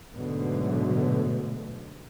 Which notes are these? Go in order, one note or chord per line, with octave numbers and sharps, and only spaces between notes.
G#2 B2 D3 F#3 A3